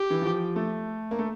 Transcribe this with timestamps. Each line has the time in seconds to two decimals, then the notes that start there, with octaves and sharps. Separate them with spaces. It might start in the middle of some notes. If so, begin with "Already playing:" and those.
Already playing: G4
0.10 E3
0.22 F3
0.56 A3
1.11 A#3
1.19 A3